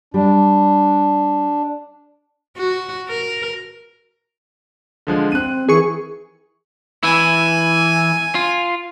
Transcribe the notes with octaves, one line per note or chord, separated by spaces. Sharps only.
G3 D4
F#4
A#4
D3 F3 G#3
C4 F#6 D#7
D#3 E3 G#4 C#6
E3 E4 G#5
F4